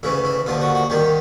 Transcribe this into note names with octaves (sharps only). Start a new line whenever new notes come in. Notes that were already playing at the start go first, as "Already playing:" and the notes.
D2 C#3 E3 E4
E4
D#2 D3 F3 F4
F#4
F#4
C2 C3 D#3 G4